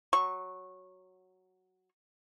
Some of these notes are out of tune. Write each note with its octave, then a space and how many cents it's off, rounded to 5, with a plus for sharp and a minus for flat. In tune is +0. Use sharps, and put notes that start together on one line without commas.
F#3 +0 C#6 -20